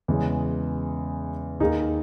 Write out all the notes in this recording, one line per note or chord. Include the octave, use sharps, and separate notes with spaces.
E2 C#3 G#3 C#4
D#2 D#3 A#3 D#4 G#4